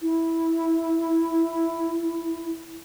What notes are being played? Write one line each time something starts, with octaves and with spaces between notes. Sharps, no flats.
E4